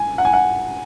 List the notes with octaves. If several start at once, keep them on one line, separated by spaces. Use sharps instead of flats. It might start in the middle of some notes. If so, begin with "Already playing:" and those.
Already playing: G#5
F#5
G#5
F#5